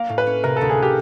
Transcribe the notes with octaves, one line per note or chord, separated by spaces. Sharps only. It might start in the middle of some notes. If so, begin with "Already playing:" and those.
Already playing: A#3 F5
A2
B4
C#4
C3 A#4
D2 A4
G#4
G4